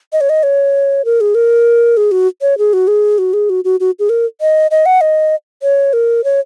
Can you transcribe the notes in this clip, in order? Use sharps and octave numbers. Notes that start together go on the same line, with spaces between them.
D#5
C#5
D#5
C#5
A#4
G#4
A#4
G#4
F#4
C#5
G#4
F#4
G#4
F#4
G#4
F#4
F#4
F#4
G#4
A#4
D#5
D#5
F#5
D#5
C#5
A#4
C#5